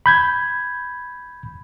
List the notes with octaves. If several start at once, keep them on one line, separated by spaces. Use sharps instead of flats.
B5 G6 G#6